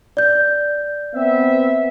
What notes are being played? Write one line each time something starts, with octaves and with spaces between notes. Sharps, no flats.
D5 G6
B3 C4 E5